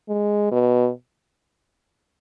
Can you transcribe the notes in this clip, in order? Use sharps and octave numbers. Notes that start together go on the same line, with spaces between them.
G#3
B2